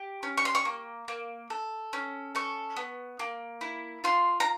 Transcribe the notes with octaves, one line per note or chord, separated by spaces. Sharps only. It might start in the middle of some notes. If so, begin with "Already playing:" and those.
Already playing: G4
C#4
C#6
C6
C#6
A#3
A#3
A4
C#4
A4 C#6
B3
A#3
E4
F4 C6
A#5